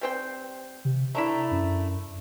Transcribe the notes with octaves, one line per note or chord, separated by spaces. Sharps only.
G3 C4 G5
C3
A3 D4 E4 A#5
F#2